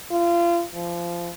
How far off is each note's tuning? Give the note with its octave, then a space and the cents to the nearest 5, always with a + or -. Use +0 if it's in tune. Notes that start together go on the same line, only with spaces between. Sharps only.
F4 -30
F3 -20